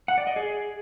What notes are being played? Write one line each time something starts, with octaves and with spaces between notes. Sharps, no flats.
F#5
D5
D#5
G#4